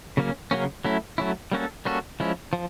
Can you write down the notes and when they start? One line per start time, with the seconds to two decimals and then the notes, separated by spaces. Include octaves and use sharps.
0.17 C#3 F#3 A#3 C#4
0.51 C#3 F#3 A#3 C#4
0.85 F#3 A3 C#4 E4
1.18 F#3 A3 C#4 E4
1.52 G3 A#3 C#4 F#4 A4
1.85 G3 A#3 C#4 F#4 A4
2.20 F3 G#3 C#4 E4
2.53 F3